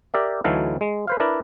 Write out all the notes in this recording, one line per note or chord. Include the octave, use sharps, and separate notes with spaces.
G4 A#4 D5 E5
D2 E3 F#3 D#4 A4 F5
G#3
B4 C5 F5
D4 E4 A#4 B4 D5